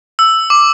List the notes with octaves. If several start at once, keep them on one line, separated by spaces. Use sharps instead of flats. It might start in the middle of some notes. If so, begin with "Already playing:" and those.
E6
D6